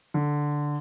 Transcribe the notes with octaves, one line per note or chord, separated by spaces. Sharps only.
D3